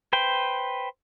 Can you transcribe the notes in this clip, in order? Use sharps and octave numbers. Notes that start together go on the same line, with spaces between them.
B4 C5 G5